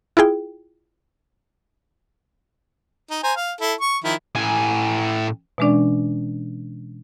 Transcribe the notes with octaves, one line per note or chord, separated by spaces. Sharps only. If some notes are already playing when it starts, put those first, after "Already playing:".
E4 F4 G#4 G5
D#4
C5 G#5 A#5
F5
E4 A4
C#6
D#3 F3 E4
A2 G#5
B2 E3 G#3 C#4 D4 D5